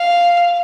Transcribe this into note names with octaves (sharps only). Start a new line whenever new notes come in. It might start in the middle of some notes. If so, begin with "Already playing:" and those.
Already playing: F5